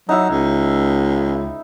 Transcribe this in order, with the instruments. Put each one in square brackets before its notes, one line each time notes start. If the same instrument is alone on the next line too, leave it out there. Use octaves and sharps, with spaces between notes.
[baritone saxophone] F#3 [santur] D#4 E4
[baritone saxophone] C#2